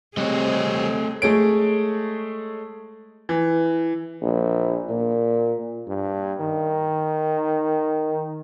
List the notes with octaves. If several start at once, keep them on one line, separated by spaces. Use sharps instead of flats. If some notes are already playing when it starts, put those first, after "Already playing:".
C3 G3 A3 C4 G#4 C#5 D#5
G#3 A3 G#4 C#5 D7
E3
A#1
A#2
G2
D#3